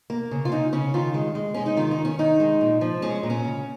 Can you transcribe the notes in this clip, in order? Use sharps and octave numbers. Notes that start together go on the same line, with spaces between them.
A#3
C#3
F4
C#3 D#4
C#3 C#4
D#3 F4
G#3
G#3
G#3 C#4
D#4
D#3 F4
D#4
D#3
C#4
D#3 D#4
G#3
A#2
F3
G#3 C#4
A#2
C#4
C#3